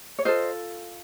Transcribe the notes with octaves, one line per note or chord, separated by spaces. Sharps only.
C#5
F4 A4 C5 D#5